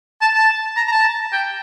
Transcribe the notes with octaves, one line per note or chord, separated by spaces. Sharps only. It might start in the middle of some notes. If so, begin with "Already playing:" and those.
A5
A5
A#5
A#5
A5
G5